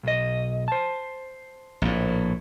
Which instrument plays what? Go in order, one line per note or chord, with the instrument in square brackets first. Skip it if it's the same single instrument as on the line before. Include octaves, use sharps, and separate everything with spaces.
[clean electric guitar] B1 D#5
C5 A5
[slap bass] A#1 A2